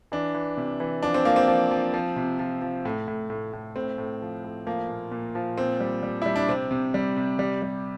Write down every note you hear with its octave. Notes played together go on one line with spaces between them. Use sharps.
E3 D4
E3
C3
E3
F3 D4
C4
F3 A#3
C4
F3
F3
F3
C3
F3
F3
A2
A2
A2
A2
A2 C4
A2
F3
A2
F3 A#3
A#2
A#2
F3
A#2 C4
G3
G3
G3 E4
D4
C3 C4
C3
G3
C3
G3
G3